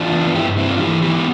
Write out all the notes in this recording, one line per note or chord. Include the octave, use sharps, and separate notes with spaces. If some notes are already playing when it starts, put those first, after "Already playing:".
Already playing: E3 D4 F4
B3
G2 E4 G4
G2 C4 E4
D4 F4
E3 E4 G4
B3 E4 G4